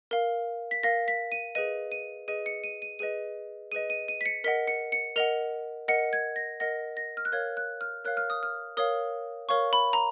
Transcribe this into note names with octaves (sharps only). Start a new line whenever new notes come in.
A#4 F5
B6
A#4 F5 A#6
B6
D#7
G#4 B4 D#5 D#7
D#7
G#4 B4 D#5 D#7
C#7
D#7
D#7
G#4 B4 D#5 D#7
G#4 B4 D#5 D#7
D#7
D#7
B6
C#7
A#4 D#5 F#5 B6
C#7
C#7
A#4 D#5 F#5 F7
A#4 D#5 F#5 C#7
G#6
A#6
A#4 D#5 F#5 A#6
A#6
F6
F#6
A#4 C#5 F5 G#6
F#6
F6
A#4 C#5 F5 F#6
F6
D#6
F6
A#4 C#5 F5 D#6
A#4 C#5 F5 C#6
B5
A#5